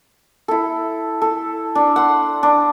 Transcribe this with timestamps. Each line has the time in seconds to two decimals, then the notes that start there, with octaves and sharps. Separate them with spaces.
0.48 E4 A4
1.22 A4
1.75 D4
1.96 F#5 C6
2.43 D4